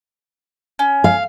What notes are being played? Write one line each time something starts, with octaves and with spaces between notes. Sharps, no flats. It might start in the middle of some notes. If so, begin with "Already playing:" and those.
C#4
F5